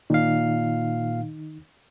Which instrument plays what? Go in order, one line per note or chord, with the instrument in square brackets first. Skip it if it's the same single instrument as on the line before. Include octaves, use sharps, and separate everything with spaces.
[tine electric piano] A#2 F5 [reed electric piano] D#3 D#4